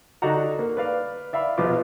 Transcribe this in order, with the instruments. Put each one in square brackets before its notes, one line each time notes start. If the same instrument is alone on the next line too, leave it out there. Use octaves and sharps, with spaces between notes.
[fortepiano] D3 D4 D#4 F#4 F#5 A#5
A#3
B4 D5 F5
D5 E5 F5 B5
A#1 B2 B3 F4 D6